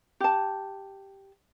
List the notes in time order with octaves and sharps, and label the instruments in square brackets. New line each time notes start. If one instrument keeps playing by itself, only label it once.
[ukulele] G4 A5